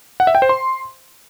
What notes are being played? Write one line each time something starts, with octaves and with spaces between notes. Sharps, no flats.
F#5
E5
G5
C5
C6